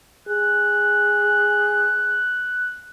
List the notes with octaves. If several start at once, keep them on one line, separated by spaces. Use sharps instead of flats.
G#4 F#6